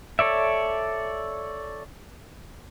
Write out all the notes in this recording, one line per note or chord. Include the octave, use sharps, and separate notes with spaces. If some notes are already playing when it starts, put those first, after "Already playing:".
A4 C#5 D5 E5